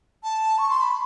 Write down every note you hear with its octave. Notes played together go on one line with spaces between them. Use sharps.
A5
C#6
C6
B5